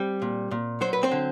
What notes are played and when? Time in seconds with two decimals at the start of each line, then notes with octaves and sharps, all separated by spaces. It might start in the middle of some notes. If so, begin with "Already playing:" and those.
Already playing: G3 C4
0.22 A#2
0.51 A#2
0.81 F#3 C5
0.93 B4
1.03 C4 C5
1.11 D3